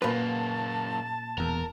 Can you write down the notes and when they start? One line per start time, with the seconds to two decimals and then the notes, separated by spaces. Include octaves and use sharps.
0.02 F#2 A#2 A#3 B4 A5
1.38 E1 E2 A#4